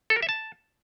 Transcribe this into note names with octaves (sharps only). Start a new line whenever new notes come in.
A4
A#4
E5
A5